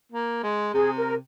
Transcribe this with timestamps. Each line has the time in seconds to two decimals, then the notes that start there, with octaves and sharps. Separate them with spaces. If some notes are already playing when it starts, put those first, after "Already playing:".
0.12 A#3
0.43 G#3
0.74 C3 G#4
0.97 A#4